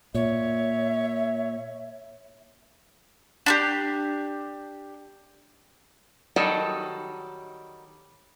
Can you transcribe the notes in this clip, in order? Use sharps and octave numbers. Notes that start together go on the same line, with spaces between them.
A#2 C#5 E5
D4 F#4 G4
D#3 F#3 G3 A4